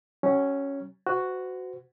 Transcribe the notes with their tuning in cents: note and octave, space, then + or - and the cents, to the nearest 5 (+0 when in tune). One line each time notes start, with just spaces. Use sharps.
F#3 +40 C#4 +0
F#4 +0 C5 -40